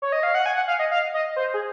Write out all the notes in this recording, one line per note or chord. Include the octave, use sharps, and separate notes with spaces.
C#5
D#5
F5
F#5
G#5
F#5
F5
D#5
F5
D#5
C5
G#4